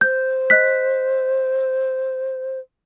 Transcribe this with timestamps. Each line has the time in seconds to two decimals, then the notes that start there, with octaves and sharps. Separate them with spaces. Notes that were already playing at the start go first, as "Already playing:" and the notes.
0.01 C5 G6
0.50 D#5 F#6 B6